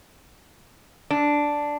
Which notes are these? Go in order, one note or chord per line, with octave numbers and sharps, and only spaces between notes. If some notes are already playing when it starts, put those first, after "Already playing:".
D4